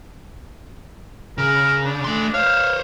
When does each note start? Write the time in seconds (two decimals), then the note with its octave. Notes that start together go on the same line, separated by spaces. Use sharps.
1.38 C#3 A#4
1.85 D4
2.04 A3 C6
2.34 C5 C#5 F5